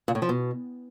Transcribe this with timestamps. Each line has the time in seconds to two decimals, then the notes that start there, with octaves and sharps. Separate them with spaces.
0.08 A#2
0.15 A2
0.22 F3
0.29 B2